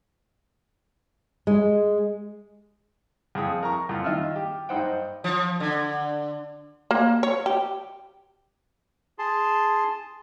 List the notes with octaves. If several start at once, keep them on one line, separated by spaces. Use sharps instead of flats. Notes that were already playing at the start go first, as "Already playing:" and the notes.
G#3
F2 G#4 G5 D#6
A#4 A#5 C#6
F2 F4
D#3 F4 D#5 E5 E6 F6
G4
G2 D#4 C5 F#5 G5
F3
D3
A#3
C#5
G4
G#4 A5 C6